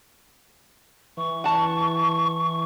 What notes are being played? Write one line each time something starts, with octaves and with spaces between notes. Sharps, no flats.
E3 C#6
F#5 A5